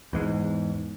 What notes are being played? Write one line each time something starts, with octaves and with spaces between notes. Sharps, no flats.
E2 G#2